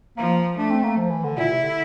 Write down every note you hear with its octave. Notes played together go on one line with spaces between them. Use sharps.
F3 A#3
A3 D4
C4
A#3
F3
E3
D3
A#2 E4
C3
D3